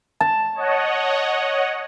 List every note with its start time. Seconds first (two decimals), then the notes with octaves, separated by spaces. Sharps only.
0.20 A5
0.55 C#5 D#5 F#5